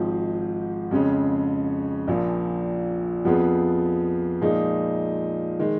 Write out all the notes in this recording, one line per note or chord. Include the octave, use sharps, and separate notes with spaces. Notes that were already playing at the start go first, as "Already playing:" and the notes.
Already playing: G#1 G#2 F3
F2 C#3 G#3 C#4
A#1 A#2 F3
F2 F3 B3 F4 G#4
A#2 F3 G#3 D#4 G#4
D#3 G#3